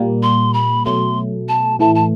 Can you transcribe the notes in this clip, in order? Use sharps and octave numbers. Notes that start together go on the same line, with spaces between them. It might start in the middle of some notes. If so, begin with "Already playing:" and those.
Already playing: A#2 G3 A#3
C6
B5
B2 F#3 A3 C6
A5
A2 E3 A3 A5
A5